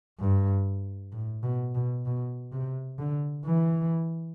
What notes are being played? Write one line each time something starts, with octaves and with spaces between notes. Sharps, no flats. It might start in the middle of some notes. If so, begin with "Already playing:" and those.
G2
A2
B2
B2
B2
C3
D3
E3